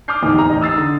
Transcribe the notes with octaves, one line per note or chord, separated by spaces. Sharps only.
D6 D#6 F6 G6 C7
D1 G#1 E2 D#3 D#4 D6
G4 A#5
A1 D#4 D#5
D#6 E6 A6 C7
D3